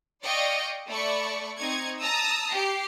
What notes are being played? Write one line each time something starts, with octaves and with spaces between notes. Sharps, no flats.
D5 D#5 F5 G5 C#6
A3 D5 B5 C#6
C4 D#4 C#6 G#6
A5 A#5 D#6 E6
G4 C7